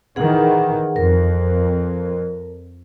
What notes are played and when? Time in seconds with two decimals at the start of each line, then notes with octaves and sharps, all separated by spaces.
0.16 D#3 E3 G#4 F#5
0.96 F2 A#4